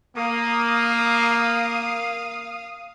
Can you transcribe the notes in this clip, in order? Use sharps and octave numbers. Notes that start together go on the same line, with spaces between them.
A#3 F5 D#6